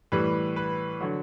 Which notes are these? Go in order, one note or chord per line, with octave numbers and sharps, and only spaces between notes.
A2 E3 G3 B4
B4
D3 F#3